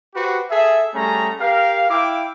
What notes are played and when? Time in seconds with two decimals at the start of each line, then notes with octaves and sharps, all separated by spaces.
0.14 F#4 G4 B4 C5
0.50 G#4 A4 E5
0.94 G3 A3 C#4 G#4 A#5
1.40 G4 A#4 F5
1.89 E4 F5 G5 D6